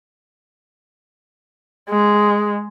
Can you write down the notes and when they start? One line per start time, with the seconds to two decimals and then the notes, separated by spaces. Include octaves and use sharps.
1.90 G#3